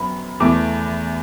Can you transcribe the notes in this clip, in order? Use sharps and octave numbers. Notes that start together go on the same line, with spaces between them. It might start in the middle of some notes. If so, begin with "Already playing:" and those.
Already playing: F#2 F#3 B3 B5
E2 E3 A3 D6